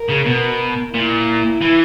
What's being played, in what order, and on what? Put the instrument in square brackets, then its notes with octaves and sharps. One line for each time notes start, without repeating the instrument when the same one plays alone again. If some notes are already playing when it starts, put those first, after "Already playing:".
Already playing: [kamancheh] A#4
[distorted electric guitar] C#3
B2
[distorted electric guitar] A#2 [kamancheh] E4
[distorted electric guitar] E3